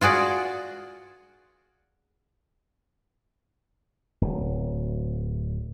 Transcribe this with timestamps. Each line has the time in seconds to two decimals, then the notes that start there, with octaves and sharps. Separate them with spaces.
0.01 F4 F#4 G#4 D5
4.21 D1